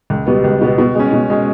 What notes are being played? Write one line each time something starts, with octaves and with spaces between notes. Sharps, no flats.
C#2
B2 G3 B3
C#2
B2 G3 B3
B2
G#3 C#4
B2
G#3 C#4